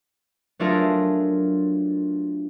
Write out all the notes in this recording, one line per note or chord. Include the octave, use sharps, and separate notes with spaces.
F#3 A3 D4 F4 G#4 A#4